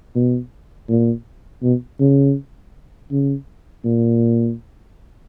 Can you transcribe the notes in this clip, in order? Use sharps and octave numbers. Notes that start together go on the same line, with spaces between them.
B2
A#2
B2
C#3
C#3
A#2